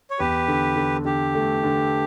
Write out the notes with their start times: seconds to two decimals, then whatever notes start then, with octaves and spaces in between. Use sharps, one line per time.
0.11 C#5
0.19 E2 G4 B4
0.48 D3
0.76 D3
1.05 D3 G4
1.35 A3
1.64 D3